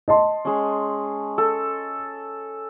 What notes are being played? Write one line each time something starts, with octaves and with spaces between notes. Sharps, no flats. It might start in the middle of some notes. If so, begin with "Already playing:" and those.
D#5 A5 C6
G#3 C#4
A4